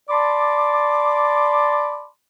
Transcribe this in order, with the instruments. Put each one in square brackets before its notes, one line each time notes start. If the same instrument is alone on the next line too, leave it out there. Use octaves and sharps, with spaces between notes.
[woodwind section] D5 A5 B5 C6 D6